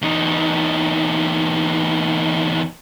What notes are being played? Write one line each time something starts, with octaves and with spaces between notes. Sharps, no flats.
E2 D#4